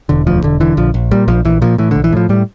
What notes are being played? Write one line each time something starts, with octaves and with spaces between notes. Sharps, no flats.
E1 D3
D2 F3
E1 D3
D3 E3
A#1 F3
A#1
A#2 G3
A#1 F3
A#1 E3
A#2 F3
A2 E3
D3
A#1
E3
A2 F3
A2 G3